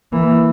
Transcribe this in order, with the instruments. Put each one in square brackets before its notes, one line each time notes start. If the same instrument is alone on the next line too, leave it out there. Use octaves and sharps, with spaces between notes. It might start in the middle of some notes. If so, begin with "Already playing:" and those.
[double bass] E3 [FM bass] A#3